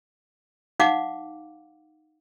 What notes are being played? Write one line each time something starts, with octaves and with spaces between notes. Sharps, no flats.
D#4 F5 F#5 D6